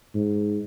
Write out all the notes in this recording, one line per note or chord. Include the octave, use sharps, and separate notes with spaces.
G#2